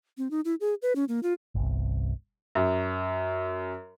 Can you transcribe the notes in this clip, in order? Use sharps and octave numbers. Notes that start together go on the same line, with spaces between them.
C4
D#4
E4
G#4
B4
C#4
A#3
F4
G1 C2
F#2